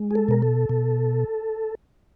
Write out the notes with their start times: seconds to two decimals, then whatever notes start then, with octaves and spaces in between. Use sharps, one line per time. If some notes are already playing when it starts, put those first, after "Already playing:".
Already playing: G#3
0.11 G#4
0.15 A4
0.28 B2 A#4
0.42 A4
0.69 B2